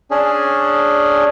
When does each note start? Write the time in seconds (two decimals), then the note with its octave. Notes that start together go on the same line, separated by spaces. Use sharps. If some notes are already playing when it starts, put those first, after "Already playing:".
0.11 C#4 D4 G#4